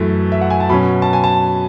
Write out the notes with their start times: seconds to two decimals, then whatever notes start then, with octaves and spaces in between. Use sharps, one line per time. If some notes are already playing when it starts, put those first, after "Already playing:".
Already playing: F#2 E3 A3
0.32 E5
0.41 F#5
0.50 G#5
0.60 A5
0.69 B2 F#3 C#4 B5
1.02 A5
1.13 G#5
1.24 A5